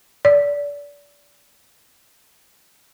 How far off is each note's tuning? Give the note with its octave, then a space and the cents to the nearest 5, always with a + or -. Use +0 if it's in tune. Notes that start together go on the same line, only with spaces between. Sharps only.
D5 -25